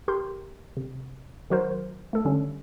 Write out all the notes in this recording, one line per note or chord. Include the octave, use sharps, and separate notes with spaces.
G4 A#4 C6 G6
C3
D#3 F#3 F#4 A#4 C5
A3 A4
D3 G3 C#4